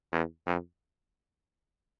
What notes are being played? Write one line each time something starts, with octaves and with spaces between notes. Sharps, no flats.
E2
F2